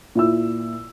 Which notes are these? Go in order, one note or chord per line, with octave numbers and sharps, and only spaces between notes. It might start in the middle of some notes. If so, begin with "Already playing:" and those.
A#2 E4 E6